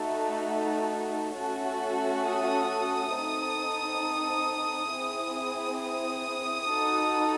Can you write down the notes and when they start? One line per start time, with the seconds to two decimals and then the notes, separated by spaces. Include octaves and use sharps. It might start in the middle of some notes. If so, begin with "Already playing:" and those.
Already playing: A3 D#4 F#4 A4
1.38 A3 C#4 F#4 A4
2.26 D#6
3.15 C4 D#4 A4
4.93 C4 E4 G#4
5.82 D#6
6.71 D#4 F#4 A4